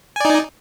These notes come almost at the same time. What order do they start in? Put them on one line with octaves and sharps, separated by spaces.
G#5 D5 D#4